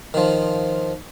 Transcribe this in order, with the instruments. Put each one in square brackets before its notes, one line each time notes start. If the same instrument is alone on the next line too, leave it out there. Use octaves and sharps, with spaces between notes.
[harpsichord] D#3 F3